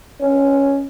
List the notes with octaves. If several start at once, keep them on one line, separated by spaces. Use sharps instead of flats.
C#4